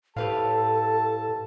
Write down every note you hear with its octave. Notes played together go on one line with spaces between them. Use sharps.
A2 G4 A4 B4 F5 A5